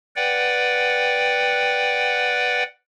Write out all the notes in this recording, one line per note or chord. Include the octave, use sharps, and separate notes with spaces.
B4 D5 F#5 G5